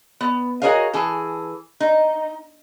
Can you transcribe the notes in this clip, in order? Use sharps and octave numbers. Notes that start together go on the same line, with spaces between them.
B3
F#4 G#4 A#4 C#5 D#5 F5
E3 G#4 A4
D#4